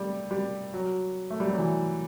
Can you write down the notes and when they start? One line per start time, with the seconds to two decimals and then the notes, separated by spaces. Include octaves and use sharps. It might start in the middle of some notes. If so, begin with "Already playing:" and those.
Already playing: G3 A3
0.31 G3
0.74 F#3
1.30 A3
1.40 G3
1.49 F#3
1.58 E3